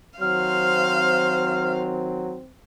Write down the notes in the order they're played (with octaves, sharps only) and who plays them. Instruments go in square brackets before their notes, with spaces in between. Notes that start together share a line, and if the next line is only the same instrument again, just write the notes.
[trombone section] D#3 C4 [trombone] F#3 [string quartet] C5 F5 [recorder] F6